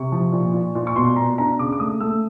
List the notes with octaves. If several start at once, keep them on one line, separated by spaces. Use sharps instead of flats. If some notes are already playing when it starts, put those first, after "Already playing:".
Already playing: C3 C#6
F3
A#2
A#2
A#2
C#6
B2 C6
B2 A#5
D4 A#5
C#3 D6
D6
A3 D#6
A3 E6